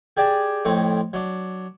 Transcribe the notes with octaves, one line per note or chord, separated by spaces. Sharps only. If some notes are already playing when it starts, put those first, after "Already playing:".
G4 G#4 D5 G5 A5
F2 A2 C4
F#3 D4